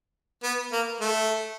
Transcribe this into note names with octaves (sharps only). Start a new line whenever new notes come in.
B3
A#3
A3